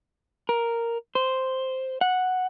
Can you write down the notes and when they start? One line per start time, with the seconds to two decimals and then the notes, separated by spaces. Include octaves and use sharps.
0.49 A#4
1.15 C5
2.01 F#5